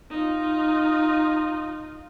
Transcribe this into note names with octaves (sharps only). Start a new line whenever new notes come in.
D#4 F4